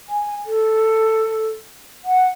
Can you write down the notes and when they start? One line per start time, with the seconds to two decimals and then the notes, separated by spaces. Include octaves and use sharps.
0.09 G#5
0.45 A4
2.04 F#5